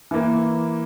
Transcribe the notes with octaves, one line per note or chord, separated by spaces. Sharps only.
E3 A#3